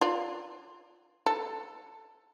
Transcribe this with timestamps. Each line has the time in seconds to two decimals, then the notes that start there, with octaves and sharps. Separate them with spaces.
0.01 F4 D5
1.26 A4